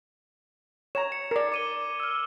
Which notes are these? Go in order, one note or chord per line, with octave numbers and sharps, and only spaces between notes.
C#5 A#5 G#6 E7
C#7
A#4 D5
D6 D#7 G7
E6 F6